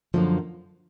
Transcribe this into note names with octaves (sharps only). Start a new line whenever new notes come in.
F#2 D3 F3 A#3